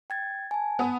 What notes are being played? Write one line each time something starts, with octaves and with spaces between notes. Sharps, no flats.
G5 G#6 A6
G#5 A5
B3 D#6